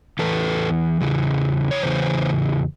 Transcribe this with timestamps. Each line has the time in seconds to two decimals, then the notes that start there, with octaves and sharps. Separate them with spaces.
0.19 E2 C#3 E3 A4 B4
1.01 E2 C#3 E3
1.71 C#5
1.82 E2 C#3 E3 C5